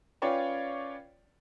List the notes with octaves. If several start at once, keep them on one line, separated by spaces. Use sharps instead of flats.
C#4 F4 B4 C#5 D5 G5